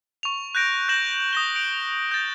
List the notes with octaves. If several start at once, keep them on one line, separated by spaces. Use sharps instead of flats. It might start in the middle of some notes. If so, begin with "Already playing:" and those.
C#6 F7
F#6 G6 A#6 D7
F#6 G6 A#6 E7 F#7
D#6 A#6 G7
D7
G6 A6